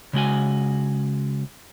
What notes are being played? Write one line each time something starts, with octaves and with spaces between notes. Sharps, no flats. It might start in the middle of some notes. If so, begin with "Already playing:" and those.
C#3 G#3 F#4 G#5